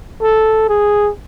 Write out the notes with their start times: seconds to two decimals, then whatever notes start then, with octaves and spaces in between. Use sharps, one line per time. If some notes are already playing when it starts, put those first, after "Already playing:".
0.22 A4
0.69 G#4